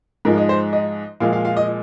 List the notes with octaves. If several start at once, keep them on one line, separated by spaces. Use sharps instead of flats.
G#2 F3 G#3 A#4
D#5
C5
D#5
A#2 F3 G#3 F5
F5
F5
D#5